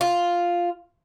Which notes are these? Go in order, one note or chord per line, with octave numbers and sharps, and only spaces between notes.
F4